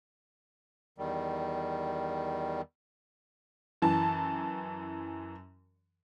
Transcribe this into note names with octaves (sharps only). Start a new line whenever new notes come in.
E2 D#3 G3
F#2 E3 A5